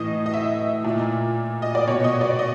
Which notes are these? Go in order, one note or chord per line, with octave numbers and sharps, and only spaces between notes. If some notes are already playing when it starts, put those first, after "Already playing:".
Already playing: A2 E3 D#5
D#5
E5
A#2
D#5
D5
B2 C#5
D#5
D5
D#5